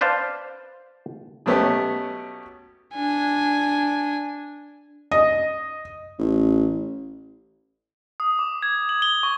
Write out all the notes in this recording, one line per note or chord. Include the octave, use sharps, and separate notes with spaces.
B4 C5 D5 F5 A5
B2 F#3 A3 B3 C#4 G4
D4 G#5
D#5
A1
D#6
D6
G#6
F#7
G7
C#6